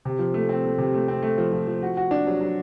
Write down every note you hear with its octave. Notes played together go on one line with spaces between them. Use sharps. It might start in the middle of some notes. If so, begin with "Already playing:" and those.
C3
F3
A3
C4
A3
C3
A3
C4
A3
F3
F3
F3
F#4
F#4
D4
F#3
F#3